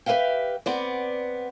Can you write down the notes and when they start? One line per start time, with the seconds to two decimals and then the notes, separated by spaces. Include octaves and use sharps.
0.06 G4 B4 C5 E5 F5 G5
0.66 B3 C4 D5